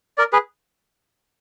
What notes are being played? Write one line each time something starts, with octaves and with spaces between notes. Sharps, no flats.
A#4 D5
G#4 B4